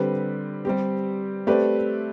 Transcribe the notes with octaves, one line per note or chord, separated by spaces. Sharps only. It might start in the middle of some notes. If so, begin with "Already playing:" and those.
Already playing: D3 G3 C4 G4 B4
G3 C4 G4
A3 C4 G4 B4 D5